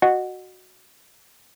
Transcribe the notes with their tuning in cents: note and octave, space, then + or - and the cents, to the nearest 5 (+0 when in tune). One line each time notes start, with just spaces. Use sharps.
F#4 +0 D#5 -25 F#5 +0